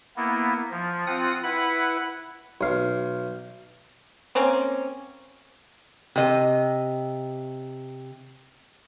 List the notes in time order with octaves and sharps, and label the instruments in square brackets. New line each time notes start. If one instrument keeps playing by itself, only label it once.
[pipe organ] A#3 B3 E4
F3
C4 F4 F#5 D#6
E4 B4 F#5 B5
[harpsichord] B1 F5
[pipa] A#3 C4 C#4
[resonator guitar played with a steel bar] C3 D#5